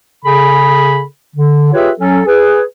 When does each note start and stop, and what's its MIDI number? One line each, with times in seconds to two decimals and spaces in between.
0.25 1.02 49
0.25 1.02 68
0.25 1.02 69
0.25 1.02 83
1.35 1.70 50
1.73 1.90 65
1.73 1.90 67
1.73 1.90 68
1.73 1.90 71
1.73 1.90 73
1.73 1.90 76
1.98 2.20 54
1.98 2.20 61
1.98 2.20 69
2.26 2.61 68
2.26 2.61 71